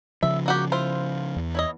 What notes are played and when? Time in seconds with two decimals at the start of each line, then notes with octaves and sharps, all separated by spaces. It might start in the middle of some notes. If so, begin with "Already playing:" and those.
0.23 C#3 F3 E5
0.46 A#3 F#4 G4
0.72 E4 F4 C5
1.36 E2
1.55 E4 C#5 D#5